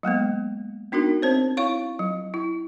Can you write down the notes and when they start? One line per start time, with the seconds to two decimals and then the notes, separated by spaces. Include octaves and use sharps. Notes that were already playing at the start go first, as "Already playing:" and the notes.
0.03 F#3 G#3 A#3 B3
0.92 B3 D4 D#4 F#4 A#4
1.22 C4 C5 C#5
1.57 E4 C#5 F5 C#6
1.99 F#3
2.34 E4